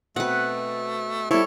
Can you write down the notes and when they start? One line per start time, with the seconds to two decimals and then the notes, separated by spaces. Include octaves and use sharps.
0.16 B2 A3 C4 B4 F#5
1.31 G3 E4 A4 C5 C#5